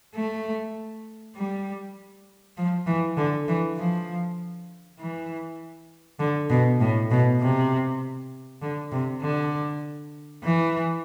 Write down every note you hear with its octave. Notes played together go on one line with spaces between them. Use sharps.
A3
G3
F3
E3
D3
E3
F3
E3
D3
B2
A2
B2
C3
D3
C3
D3
E3